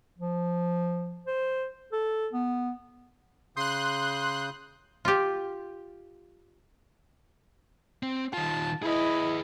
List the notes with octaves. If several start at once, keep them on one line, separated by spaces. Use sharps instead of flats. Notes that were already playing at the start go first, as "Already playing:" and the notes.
F3
C5
A4
B3
C#3 C6 D#6 F#6 G6
F4 G4
C4
D#3 F4 A5
E4 G#4 B4 D#5